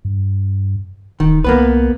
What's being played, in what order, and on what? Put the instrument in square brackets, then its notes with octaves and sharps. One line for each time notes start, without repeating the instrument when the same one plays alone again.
[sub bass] G2
[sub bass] D1 [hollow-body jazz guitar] D#3
[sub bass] C2 [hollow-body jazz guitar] A#3 B3 B4